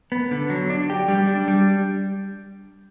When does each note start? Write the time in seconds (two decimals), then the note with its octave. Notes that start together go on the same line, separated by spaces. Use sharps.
0.12 B3
0.31 D3
0.50 F#3
0.70 D4
0.90 G4
1.08 G3
1.27 D4
1.48 G3